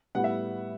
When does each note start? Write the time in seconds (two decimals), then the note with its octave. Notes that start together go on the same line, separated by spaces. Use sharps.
0.15 A2 G3 B3 F#5
0.24 E5